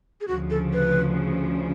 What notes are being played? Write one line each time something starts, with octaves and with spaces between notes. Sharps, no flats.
G#4
D2 C#3 F3 F#4
A4
B4